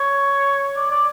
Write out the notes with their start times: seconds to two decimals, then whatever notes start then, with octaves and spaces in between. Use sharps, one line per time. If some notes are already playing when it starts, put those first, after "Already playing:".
Already playing: C#5
0.76 D5
0.91 D5